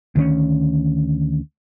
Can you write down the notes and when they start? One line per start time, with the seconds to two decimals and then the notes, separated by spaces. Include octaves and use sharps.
0.16 D2 D#3 B3 C#4